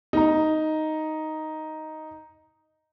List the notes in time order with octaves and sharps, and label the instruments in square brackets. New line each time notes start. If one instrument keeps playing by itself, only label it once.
[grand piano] D#4 A#5